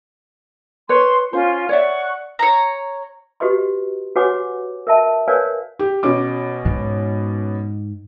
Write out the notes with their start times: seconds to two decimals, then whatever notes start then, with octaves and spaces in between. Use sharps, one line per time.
0.89 B4 C#5 C6
1.33 C#4 F4 C5
1.69 C#5 D5 E5 F#5 C#6
2.39 C#5 A#5
3.40 F#4 G4 B4 D#5 C6
4.16 F#4 B4 C#5 F#5 G#5 D6
4.87 A#4 D#5 E5 A5
5.28 A#4 B4 C#5 D5 F5 G#5
5.79 G4
6.03 B2 C#4 D6
6.65 G#2